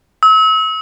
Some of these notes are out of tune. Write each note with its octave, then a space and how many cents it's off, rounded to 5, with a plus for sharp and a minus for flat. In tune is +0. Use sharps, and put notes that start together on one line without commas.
E6 -40